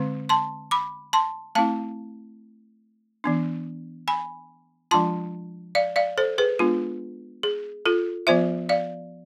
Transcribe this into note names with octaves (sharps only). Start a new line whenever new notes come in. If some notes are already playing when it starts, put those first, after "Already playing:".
Already playing: D3 G#3 C4
A5 C6
B5 D6
A5 C6
A3 C4 E4 F5 A5
E3 B3 D4
G#5 B5
F3 G#3 D4 F4 A5 C6
D5 F5
D5 F5
A4 C5
G#4 B4
G#3 B3 D4 F4
G#4
F4 A4
F3 B3 F4 C5 E5
D5 F5